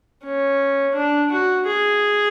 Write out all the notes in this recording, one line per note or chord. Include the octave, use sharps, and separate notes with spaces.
C#4
D4
F#4
G#4